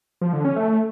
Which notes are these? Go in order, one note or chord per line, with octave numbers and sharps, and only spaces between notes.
F3
D3
C#4
A3